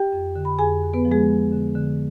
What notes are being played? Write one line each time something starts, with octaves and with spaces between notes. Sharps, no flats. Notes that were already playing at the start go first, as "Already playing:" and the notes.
Already playing: G4 G5
F2
D3
B5
F2 G#4 G#5
D3
B3 B4
F3
G#3 G#4
D3
D3
D3